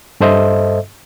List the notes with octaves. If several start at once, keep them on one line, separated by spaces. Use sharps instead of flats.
G2 A4 C5 D#5 E5